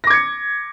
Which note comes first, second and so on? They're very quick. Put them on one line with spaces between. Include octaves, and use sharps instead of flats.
A#6 D6 G#6 C#7